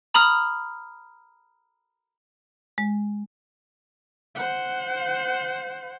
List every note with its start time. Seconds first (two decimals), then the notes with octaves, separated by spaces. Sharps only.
0.14 A#5 B5 D#6 F6
2.78 G#3
4.35 C5 F#5